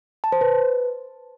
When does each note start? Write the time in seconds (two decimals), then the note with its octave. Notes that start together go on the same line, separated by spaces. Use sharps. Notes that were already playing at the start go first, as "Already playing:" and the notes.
0.24 A5
0.32 C5
0.41 B4